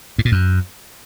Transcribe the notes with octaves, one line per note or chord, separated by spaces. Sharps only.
G#2
A#2
F#2